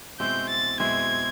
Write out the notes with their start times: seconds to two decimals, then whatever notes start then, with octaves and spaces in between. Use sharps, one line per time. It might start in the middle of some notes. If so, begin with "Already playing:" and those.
0.20 B2 G#3 C4 E4 G6
0.50 A6
0.80 B2 G#3 C4 E4 G#6